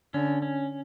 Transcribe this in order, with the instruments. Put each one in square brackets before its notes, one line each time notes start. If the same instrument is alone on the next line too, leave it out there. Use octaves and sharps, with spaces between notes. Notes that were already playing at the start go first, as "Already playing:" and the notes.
[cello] D3 [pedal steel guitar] C#4
[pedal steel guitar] C#4